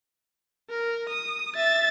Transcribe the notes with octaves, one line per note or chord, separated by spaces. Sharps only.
A#4
D#6
E5 A6